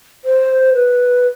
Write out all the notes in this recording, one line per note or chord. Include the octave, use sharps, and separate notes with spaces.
C5
B4